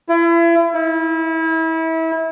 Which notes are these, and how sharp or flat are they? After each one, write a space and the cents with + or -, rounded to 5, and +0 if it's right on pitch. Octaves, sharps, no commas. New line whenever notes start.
E4 +35
E4 -30